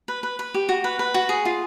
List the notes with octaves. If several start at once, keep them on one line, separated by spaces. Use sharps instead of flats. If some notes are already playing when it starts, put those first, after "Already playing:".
B4
B4
B4
G4
F#4
B4
B4
F#4
G#4
F4